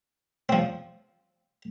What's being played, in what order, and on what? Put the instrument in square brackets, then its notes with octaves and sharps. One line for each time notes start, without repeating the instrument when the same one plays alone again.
[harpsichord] F3 C4